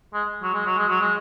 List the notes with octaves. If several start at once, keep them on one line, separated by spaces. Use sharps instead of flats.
G#3
F#3
G#3
F#3
G#3
F#3
G#3